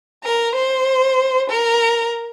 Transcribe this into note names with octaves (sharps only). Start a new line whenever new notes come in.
A#4
C5
A#4